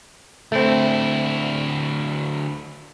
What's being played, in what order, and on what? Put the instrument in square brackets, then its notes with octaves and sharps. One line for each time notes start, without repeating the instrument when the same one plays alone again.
[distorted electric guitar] D2 E4 [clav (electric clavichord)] A3 C4